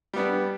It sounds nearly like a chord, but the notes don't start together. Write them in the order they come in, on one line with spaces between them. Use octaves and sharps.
G3 B3 D4